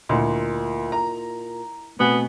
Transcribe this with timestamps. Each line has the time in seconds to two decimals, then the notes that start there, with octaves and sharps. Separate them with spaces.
0.09 D2 A#2 E4 D#5 C6
0.92 A#5
2.00 B2 A3 B3 C4 G#5